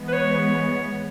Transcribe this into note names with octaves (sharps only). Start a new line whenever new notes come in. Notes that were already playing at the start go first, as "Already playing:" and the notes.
Already playing: E3 G#3 B3
B4
C#5